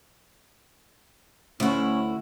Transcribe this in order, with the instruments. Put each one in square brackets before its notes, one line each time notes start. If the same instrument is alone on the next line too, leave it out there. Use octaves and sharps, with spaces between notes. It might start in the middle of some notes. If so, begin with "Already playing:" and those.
[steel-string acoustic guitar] D2 [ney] C#4 [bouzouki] E4 F#4